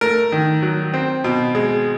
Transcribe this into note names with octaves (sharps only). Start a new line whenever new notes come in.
A3 A#4
D#3
F#3
C4
B2
G#3